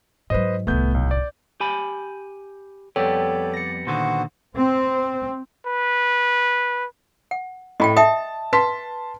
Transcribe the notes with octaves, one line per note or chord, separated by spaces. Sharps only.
G#2 F#3 B4 C5 D#5
D1 C2 A3 B3 G6
B1
D5
G4 G#5 B5
F2 G3 B3 A4 C#5 D5 G5
A#6 C#7
A#2 D3 D#3 B3 F#4 C5
C4
B4
F#5
A2 D#5 G5 B5
E5 G5 A5 D#6
B4 A5 C6 B6